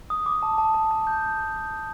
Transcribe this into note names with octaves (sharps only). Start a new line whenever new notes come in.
D#6
D6
A5
A5
A5
A5
G6